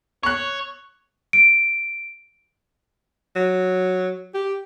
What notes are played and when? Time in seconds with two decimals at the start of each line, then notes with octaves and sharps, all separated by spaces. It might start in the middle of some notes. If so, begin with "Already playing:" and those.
0.23 C#5 C#6 F#6
1.33 D7
3.36 F#3
4.34 G4